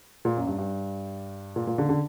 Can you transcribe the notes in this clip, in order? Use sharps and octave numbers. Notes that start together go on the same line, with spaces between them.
A#2
F#2
G2
G2
A#2
A#2
D3
D3